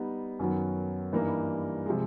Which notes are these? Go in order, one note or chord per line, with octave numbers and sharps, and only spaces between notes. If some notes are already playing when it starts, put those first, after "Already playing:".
Already playing: G3 B3 D#4
F#2 D#3 F#3 B3
G2 E3 G3 A#3 D#4
C3 F3 G#3